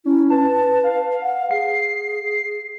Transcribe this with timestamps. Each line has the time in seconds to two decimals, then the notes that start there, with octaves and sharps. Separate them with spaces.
0.05 C#4 E4
0.30 B4 A5
0.84 F5
1.22 F#5
1.51 G#4 C7